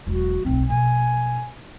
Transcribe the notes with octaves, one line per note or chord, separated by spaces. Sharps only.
E1 F#3 F#4
D1 B1 C4
A#1 B2 G#5